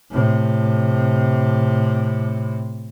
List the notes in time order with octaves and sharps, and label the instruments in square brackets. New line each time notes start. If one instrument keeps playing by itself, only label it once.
[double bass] A2 C3